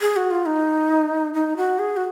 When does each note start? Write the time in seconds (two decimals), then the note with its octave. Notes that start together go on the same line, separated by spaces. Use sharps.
0.01 G#4
0.16 F#4
0.31 F4
0.46 D#4
1.34 D#4
1.57 F#4
1.79 G#4
1.97 F#4